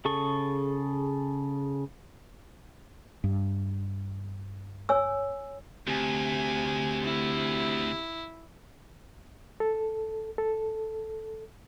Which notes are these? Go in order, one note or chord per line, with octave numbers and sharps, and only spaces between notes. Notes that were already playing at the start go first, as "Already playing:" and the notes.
C#3 G#4 A4 C#6
G2
C#5 G#5 E6
D2 C3 G#5
E4
A4
A4